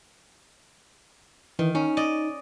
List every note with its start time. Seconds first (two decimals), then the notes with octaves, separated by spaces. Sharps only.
1.59 D#3 E3
1.75 C#4 D#4
1.97 D5 D#5